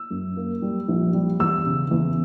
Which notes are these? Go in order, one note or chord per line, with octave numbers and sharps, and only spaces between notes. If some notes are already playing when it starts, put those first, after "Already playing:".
Already playing: E6
F#2
A#3
G3
A#1
G3
E2 E6
C#3
E2